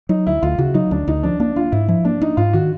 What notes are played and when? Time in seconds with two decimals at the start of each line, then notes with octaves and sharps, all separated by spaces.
0.09 F#3 D#4
0.27 D2 E4
0.42 D2 F4
0.58 C#3 F#4
0.74 F#3 D#4
0.91 D2 D4
1.08 D2 D#4
1.23 F3 D4
1.40 A#3 D4
1.56 D4 F4
1.72 G#2 E4
1.88 F3 E4
2.05 A#3 D4
2.22 D4 D#4
2.37 G#2 F4
2.53 D#3 F#4